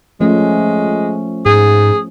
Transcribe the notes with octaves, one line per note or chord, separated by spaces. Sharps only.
F3 G#3 A3 C#4
G#2 G#4